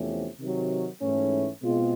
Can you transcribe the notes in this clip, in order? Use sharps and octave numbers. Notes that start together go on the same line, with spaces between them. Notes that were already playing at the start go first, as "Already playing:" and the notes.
Already playing: E2 C3 F3 A3 C#4
C3 D#3 F#3
G#2 E3 A3 C#4
B2 G#3 C4 F4